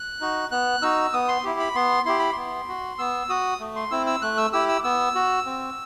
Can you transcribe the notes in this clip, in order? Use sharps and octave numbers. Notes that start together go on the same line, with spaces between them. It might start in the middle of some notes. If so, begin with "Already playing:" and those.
Already playing: F#6
D#4 F#4
B3 F#6
D#4 F#4 E6
B3 D#6
C6
E4 G4
B5
B3 C6
E4 G4 C6
B5
B3 C6
F#4
B3 E6
F#4 D#6
A3
C6
C4 E4 E6
E6
A3 F#6
E6
E4 G4 E6
E6
B3 E6
F#4
C4